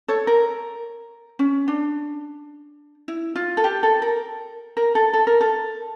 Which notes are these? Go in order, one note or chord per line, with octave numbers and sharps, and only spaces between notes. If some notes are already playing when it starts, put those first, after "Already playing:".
A4 C#5
A#4
C#4
D4
E4
F4
A4
G4
A4
A#4
A#4
A4
A4
A#4
A4